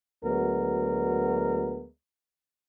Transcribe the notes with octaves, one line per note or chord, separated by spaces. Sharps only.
D2 F#3 G#3 B3 A#4